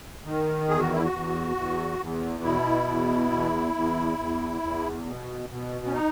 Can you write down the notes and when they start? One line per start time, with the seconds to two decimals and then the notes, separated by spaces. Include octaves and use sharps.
0.24 D#3
0.69 E2 G#4
0.80 F#4
0.92 E4
1.04 F#4
1.12 E2
1.56 E2
1.99 E2
2.43 B2 E4
2.87 E2
3.31 E2
3.74 E2
4.18 E2
4.62 E2
5.06 B2
5.50 B2
5.86 C#4
5.93 D#4